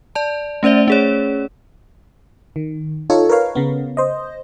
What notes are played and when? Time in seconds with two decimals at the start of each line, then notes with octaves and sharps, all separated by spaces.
0.15 D5 A5
0.63 A3 C#4 C5 D5 E5
0.88 C#4 G#4 C#5
2.56 D#3
3.10 D#4 F4 A4 C#5
3.29 A#4 B4 C#5 F5
3.55 C#3 B3
3.97 C5 D#5